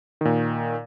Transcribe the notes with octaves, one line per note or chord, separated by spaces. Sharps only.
A#2 D#3